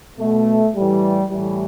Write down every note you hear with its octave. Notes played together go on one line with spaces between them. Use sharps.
B2 A3
A2 E3 G3
A2 E3 G3